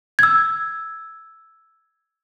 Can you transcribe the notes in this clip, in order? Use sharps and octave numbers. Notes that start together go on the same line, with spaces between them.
E6 G#6